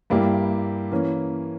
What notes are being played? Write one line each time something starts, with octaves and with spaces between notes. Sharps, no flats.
G2 G3 A#3 E4 G4
E3 A#3 C#4